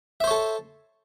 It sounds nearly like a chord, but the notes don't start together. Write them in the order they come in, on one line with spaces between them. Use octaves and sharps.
E5 C5 C#5 A4